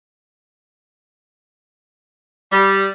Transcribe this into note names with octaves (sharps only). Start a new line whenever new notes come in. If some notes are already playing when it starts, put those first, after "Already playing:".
G3